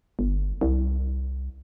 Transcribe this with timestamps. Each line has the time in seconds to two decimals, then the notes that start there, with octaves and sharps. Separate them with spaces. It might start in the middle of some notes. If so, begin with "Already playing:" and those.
0.19 G1
0.61 C2